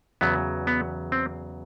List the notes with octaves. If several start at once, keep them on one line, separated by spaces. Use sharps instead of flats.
E2 C#3 F#3 B3
B3
C4